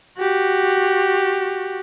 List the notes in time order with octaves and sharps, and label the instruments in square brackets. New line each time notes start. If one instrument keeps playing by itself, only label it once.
[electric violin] F#4 G4